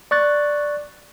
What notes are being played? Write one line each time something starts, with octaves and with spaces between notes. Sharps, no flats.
D5 C#6 F#6 A6